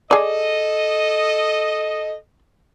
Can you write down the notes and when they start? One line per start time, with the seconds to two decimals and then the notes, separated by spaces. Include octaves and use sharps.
0.11 G#4 A4 D5 D#5